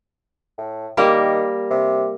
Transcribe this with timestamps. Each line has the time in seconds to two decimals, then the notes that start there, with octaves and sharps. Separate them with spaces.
0.58 A2
0.97 D#3 G3 A#3 A#4
1.70 C3